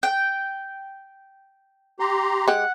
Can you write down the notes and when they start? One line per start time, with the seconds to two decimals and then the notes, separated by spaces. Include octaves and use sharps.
0.03 G5
2.00 G4 A#5 C6
2.48 G#3 G4 F#5